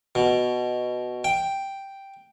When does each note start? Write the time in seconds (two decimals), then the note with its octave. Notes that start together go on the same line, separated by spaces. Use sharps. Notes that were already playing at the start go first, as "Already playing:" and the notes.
0.15 B2
1.24 G5